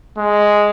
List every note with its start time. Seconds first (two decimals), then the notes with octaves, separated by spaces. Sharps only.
0.18 G#3